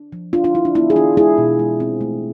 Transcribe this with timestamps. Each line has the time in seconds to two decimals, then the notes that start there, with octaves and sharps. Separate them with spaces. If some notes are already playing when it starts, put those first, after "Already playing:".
Already playing: D4
0.12 F3
0.33 D4 F4
0.44 D4 F4
0.54 D4 E4
0.65 D4
0.75 B3 E4
0.90 G#4
0.96 E3 D4 F4
1.17 G#3 E4 G#4
1.38 B2
1.59 G#3
1.80 C4
2.01 A3